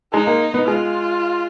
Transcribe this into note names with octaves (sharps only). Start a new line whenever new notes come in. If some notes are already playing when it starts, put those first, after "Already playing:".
G#3 D#4
A#3
B3
G#3 F4